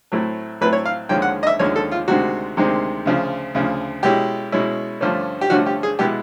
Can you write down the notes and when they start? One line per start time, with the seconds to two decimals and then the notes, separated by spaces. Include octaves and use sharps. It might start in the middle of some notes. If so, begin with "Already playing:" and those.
0.12 A2 F#3 A3 C4 E4
0.61 A2 F#3 A3 C4 E4 B4
0.73 C#5
0.85 F5
1.09 D#2 D3 F3 G#3 C#4 G5
1.22 F#5
1.43 D#5
1.47 E5
1.59 D#2 D3 F3 G#3 C#4 C#5
1.76 A4
1.92 F4
2.08 D2 C3 D#3 G#3 C4 F#4
2.57 D2 C3 D#3 G#3 C4
3.05 D2 C#3 F3
3.55 D2 C#3 F3
4.03 B2 G#3 C#4 E4 G4
4.52 B2 G#3 C#4 E4
5.01 G2 D3 F3 A3 C#4
5.41 G4
5.50 G2 D3 F3 A3 C#4 F#4
5.66 G4
5.83 G#4
5.99 B2 G#3 B3 E4 G4